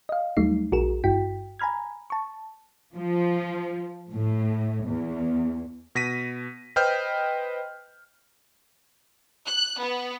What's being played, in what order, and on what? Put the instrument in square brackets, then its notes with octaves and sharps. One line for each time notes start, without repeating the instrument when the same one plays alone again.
[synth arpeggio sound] D#5 F5
D#2 F#3 G3 A3 D#4 C7
A#1 F#4 G#4 A#4 E7
G1 G2 E4 F#4 G5 B6
G#5 A#5 B5 F6 G#6
A5 C#6
[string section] F3
A2
E2
[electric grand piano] B2 A#6 B6 D#7
B4 C5 D#5 G5 F6 G6
[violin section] F#6
B3